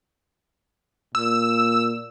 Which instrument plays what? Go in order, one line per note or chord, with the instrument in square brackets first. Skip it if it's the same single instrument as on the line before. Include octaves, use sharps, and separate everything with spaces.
[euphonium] A#2 [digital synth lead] E6